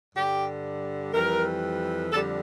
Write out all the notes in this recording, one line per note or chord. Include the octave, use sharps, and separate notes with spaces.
G2 D3 G3 G4
F2 E3 G3 A#4
F2 D3 G3 A4